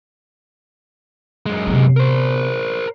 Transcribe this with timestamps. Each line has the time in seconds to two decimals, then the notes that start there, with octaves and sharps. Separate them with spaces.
1.46 F#2 G#3
1.67 C3 B3
1.97 A#4 C5